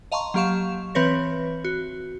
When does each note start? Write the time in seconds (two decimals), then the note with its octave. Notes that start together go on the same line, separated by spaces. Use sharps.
0.12 D#5 F5 A5 A#5 C6 C#6
0.34 F#3 A#3 G4 F5 C#6 E7
0.95 E3 C4 B4 C#5 A#6
1.64 F#4